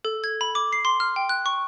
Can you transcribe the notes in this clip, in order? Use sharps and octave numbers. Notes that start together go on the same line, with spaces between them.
A4
G#6
B5
D6
C7
C6
F6
G5
F#6
C#6